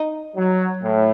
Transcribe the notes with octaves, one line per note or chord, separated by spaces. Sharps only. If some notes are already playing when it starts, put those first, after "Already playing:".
Already playing: D#4
F#3
A2